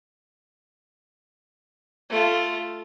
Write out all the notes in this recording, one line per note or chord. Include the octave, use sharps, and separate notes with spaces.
A3 F4